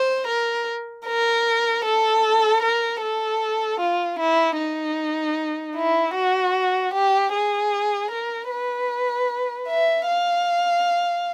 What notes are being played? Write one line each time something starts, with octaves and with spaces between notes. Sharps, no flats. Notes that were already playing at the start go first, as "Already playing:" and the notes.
Already playing: C5
A#4
A#4
A4
A#4
A4
F4
E4
D#4
E4
F#4
G4
G#4
A#4
B4
E5
F5